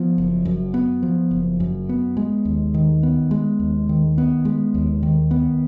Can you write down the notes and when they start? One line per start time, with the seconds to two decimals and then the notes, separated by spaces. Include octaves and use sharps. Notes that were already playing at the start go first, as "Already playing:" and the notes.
Already playing: F3 B3
0.18 F#1
0.45 F#2
0.74 B3
1.03 F3
1.31 F#1
1.60 F#2
1.89 B3
2.17 G#3
2.45 D#2
2.74 D#3
3.03 B3
3.31 G#3
3.60 D#2
3.89 D#3
4.18 B3
4.45 G#3
4.74 D#2
5.03 D#3
5.31 B3